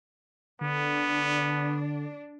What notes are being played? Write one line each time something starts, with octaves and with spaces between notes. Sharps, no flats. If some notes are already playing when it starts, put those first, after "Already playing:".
D3 B3 D4